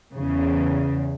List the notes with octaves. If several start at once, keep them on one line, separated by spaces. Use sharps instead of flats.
E2 C#3